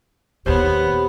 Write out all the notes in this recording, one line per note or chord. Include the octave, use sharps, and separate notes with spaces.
D#2 A#2 B3 G4 C5 C#5